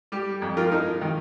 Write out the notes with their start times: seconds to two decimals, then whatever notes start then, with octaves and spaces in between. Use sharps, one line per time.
0.12 G3 G4
0.42 F2
0.57 F4 A#4
0.72 D#4
1.01 D#3